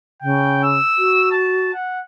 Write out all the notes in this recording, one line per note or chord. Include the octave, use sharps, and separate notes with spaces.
C#3 G5
E6
F#4
A5
F#5